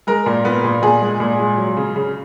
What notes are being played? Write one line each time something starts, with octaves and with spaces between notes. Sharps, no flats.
G#3 A#4
A#2
B3
A#2
A#2 G#4
G#3
A#2
G#3
F#3
C#3
C#3